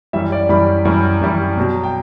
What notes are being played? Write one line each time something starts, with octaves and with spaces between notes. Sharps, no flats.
F#2 E3 G3 E5
D5
F#2 E3 G3 B5
F#2 E3 G3
F#2 E3 G3
B2 F#3
G5